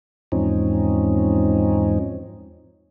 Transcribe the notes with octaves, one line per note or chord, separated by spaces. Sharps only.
E2 G#2 F3 C4 C#4 D#4